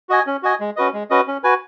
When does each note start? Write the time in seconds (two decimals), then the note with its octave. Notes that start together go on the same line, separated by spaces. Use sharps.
0.09 F#4 D#5 G#5
0.27 C#4
0.43 F#4 D#5 G#5
0.60 G#3
0.77 C#4 F#4 B4 D#5
0.93 G#3
1.10 C#4 F#4 B4 D#5
1.28 C#4
1.44 F#4 B4 G#5